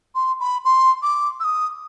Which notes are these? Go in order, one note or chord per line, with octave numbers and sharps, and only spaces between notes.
C6
B5
C6
D6
E6
D#6